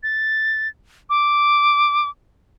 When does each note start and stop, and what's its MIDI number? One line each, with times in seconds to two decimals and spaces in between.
0.03 0.68 93
1.10 2.08 86